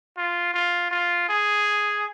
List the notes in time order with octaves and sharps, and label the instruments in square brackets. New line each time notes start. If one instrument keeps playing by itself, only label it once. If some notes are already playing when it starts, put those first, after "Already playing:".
[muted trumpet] F4
F4
F4
G#4